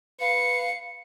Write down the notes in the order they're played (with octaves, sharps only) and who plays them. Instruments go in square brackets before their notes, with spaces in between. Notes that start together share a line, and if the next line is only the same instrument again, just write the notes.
[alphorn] B4 [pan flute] F5 [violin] C#7